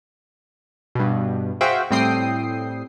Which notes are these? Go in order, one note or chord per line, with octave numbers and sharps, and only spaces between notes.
G2 B2
F#4 G#4 C5 E5 F5 G5
A2 G3 C4 G5 D#6 C7